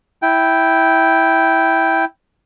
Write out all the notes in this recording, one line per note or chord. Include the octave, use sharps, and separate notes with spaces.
E4 G5